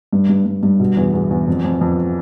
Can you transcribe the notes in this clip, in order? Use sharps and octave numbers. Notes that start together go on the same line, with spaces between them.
G2
G2
G2
G2
B2
E2
E2
E2
F2
F2
F2